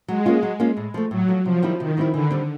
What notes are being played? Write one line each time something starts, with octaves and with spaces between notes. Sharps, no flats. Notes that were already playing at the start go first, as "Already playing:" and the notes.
F#3 G#3
A#3 C#4 F4
F#3
A#3 C#4 F4
A2
F3 A3
A2 F#3
F3 A3
C3 F3
D#3 G3 C4 E4
C3 D#3
D#3 G3 C4 E4
D3 E3
G3 C4